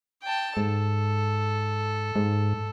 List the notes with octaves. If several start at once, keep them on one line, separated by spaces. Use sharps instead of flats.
G5 A5
G#2 A4
G#2